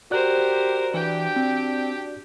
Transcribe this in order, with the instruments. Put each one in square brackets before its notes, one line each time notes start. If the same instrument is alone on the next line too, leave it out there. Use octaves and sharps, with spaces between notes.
[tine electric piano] F#4 D5 F#6 [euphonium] G4 [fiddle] A#4 C5
[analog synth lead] E3 [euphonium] D4 [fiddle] G4 G5
[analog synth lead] C4